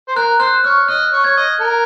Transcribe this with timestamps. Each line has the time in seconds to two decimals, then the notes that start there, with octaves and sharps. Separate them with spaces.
0.08 C5
0.16 A#4 F#6
0.40 C5 F#6
0.64 C#5 F6
0.88 D#5 F#6
1.13 C#5
1.24 C#5 G#6
1.37 D#5
1.61 A#4